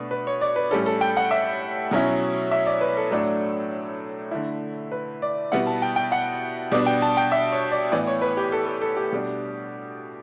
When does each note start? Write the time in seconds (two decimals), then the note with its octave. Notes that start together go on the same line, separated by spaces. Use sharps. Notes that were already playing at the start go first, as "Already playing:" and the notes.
Already playing: B2 A3 D4 B4
0.11 B4
0.27 C#5
0.41 D5
0.56 B4
0.71 A2 G3 C#4 A4
0.86 A4
1.01 G5
1.17 F#5
1.31 E5
1.91 B2 F#3 C#4 E4
2.51 E5
2.66 D5
2.81 B4
2.97 A4
3.11 A2 F#3 A3 D4 A4
4.31 D3 A3 E4
4.92 B4
5.22 D5
5.52 B2 G3 B3 E4 F#5
5.67 A5
5.82 G5
5.96 G5
6.12 F#5
6.72 B2 G3 B3 D4 D5
6.86 G5
7.02 A5
7.17 G5
7.32 E5
7.52 C#5
7.72 D5
7.92 A2 E3 B3 D5
8.07 C#5
8.22 B4
8.37 G4
8.52 A4
8.66 A4
8.82 A4
8.97 G4
9.12 B2 G3 D4